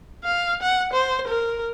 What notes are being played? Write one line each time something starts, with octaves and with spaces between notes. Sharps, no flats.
F5
F#5
C5
A#4